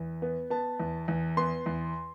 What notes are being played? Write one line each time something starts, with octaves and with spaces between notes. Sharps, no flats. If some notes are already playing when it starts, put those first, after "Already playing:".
Already playing: E2
B3
B3 A5
E2
E2
B3 C6
E2